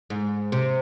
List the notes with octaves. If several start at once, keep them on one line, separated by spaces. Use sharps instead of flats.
G#2
C3